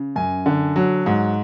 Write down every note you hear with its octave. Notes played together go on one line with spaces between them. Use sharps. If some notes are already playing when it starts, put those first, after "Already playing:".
Already playing: C#3
F#2 G#5
D3
F#3
G#2